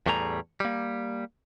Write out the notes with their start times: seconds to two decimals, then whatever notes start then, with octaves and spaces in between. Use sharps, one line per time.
0.06 E2 A2 G3 A3 G#4 A#5
0.60 G3 A#3